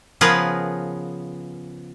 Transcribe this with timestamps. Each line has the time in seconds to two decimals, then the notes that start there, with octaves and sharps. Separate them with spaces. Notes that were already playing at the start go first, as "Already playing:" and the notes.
0.21 C#3 F3 B3 G#4 A#4 B4